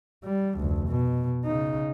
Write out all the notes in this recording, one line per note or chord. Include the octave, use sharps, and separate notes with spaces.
G3
F1 D2
B2
C#3 D#4